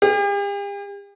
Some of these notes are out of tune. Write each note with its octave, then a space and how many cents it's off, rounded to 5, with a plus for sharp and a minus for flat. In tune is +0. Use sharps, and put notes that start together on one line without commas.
G4 +45